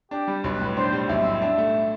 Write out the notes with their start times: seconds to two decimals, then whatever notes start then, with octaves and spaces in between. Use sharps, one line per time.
0.11 D4 G4
0.28 G3
0.44 B1 B4
0.60 A2
0.76 D4 C5
0.93 G3
1.08 B1 E5
1.25 A2
1.42 D4
1.58 A3